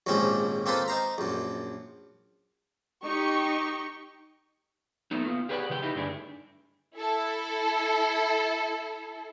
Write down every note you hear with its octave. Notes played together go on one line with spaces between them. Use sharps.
A#1 D#2 G#2 F3 C4 C#4
A#3 C4 F4 A4 B4 C5
D#4 C5 A#5
A#1 F#2
D#4 G4 C#6
F#3 A3 B3 D#4
B3 F4
G4 G#4 B4 C#5 D5 F#5
C#3 F3 G4 G5
D#4 E4 G4 B4 D#5
G2 D3 A3 D4 G#4
E4 A4